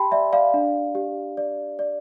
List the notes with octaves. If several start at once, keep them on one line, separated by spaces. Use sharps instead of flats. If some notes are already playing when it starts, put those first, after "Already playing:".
Already playing: G4 G5 A5 B5 C6
D5 E5
D5 F5
D4
G4
D5
D5